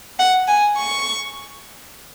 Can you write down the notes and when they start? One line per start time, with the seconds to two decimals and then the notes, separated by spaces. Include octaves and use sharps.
0.19 F#5
0.48 G#5
0.78 C#6